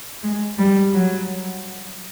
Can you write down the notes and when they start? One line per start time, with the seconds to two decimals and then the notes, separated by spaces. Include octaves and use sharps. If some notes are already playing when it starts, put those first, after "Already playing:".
0.23 G#3
0.58 G3
0.94 F#3